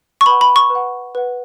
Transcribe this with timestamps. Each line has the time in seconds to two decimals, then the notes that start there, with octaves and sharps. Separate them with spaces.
0.21 C#6
0.26 B4 F#5 B5
0.41 B5
0.56 C#6
0.70 B4
0.75 F#5
1.15 B4 F#5